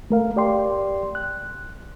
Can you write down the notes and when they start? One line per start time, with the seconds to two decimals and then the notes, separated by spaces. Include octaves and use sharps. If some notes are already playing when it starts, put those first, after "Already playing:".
0.10 A3 A#4 F5
0.36 G4 D5 G5 C6
1.15 F#6